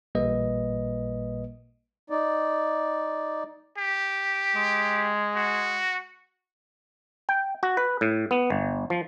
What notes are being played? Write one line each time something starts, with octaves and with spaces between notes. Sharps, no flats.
A1 A#2 G3 A#3 B4 D#5
D#4 D5
G4
G#3
F#4
G5
F#4
B4
A2
B3
G1
F3